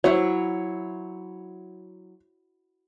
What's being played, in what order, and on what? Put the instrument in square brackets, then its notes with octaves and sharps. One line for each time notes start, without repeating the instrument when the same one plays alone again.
[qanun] F#3 E4 [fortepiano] C5 C#5